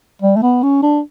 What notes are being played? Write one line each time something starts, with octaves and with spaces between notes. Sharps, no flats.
G3
A3
B3
C#4
D4